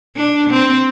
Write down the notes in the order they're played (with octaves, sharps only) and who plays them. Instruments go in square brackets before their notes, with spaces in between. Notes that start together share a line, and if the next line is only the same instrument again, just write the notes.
[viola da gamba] D4
C4